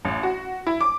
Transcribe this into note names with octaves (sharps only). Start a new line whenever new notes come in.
A1
F#4
E4
D6